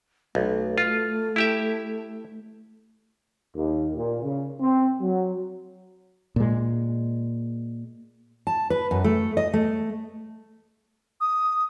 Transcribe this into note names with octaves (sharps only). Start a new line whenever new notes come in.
B1 A3
F4
E4 G4 E5
D#2
A#2
C#3
C4
F#3
A#2 G#3
A5
B4
F#2
A3
D#5
A3
D#6